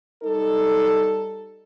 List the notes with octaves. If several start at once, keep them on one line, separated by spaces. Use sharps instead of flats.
G3 D#4 A4